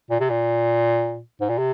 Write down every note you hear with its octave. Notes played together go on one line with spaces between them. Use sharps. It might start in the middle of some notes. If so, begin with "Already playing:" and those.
A#2
C3
A#2
G#2
A#2
C3